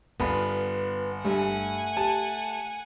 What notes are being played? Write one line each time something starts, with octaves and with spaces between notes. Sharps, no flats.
G1 B3 F4 B5
G2 G3 A3 F#5 G#5
G4 A5